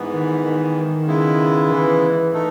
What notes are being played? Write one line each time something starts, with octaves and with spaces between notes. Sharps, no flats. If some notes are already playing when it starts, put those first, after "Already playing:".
Already playing: G#2 E3 B3
D#3
D#3
C#3 G#3 B3 E4
E3
D#3 A3 D#4 A4